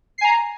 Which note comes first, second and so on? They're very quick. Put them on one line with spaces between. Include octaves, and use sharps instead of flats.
C7 G#5 A#5